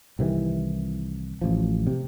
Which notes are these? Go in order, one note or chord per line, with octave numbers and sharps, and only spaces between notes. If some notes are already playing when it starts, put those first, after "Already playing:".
C2 C3 D#3 E3
A1 F3
C3